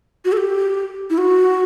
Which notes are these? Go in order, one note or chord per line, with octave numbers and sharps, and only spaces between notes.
F#4
A4
G4
E4
F#4